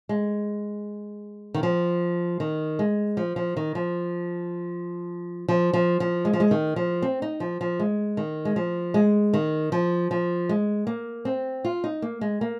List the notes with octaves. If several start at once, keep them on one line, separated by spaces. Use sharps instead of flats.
G#3
D#3
F3
D#3
G#3
F3
F3
D#3
F3
F3
F3
F3
G#3
F3
G#3
D#3
F3
C4
D#4
F3
F3
G#3
D#3
G#3
F3
G#3
D#3
F3
F3
G#3
A#3
C4
F4
D#4
A#3
G#3
A#3